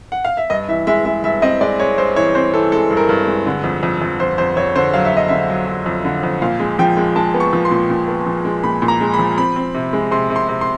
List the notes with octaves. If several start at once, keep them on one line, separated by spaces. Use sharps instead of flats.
F#5
F5
E5
G2 D#5
E3 E5
G#3 E5
G#3 E5
G2 E5
C4 D#5
G#3 D5
G#3 C#5
G2 C5
E3 C#5
C4 C5
E3 A4
G#3 A4
G2
A#4
G2
G#3
D3
F2
F2
F2
F2 C5
F2 C5
F2 C#5
D3 C5
F#3 F5
E5
F#3 D#5
D3 E5
F#3
F#3
F2
D3
F2
A#2 F5
G#3
F3 G5
G#3
G#3 A5
B3
C#6
F3
C6
A#2
A#2
B3
F3
G#3
A#2 B5
A#2
A#5
G#3
B5
F3
C4 B5
C4
C3
G#3
C3 C6
C3
C6
C3
C6